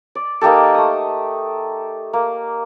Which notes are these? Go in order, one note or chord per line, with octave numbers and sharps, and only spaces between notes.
D5
A#3 D#4 G4 A4
A3 D#6
A#3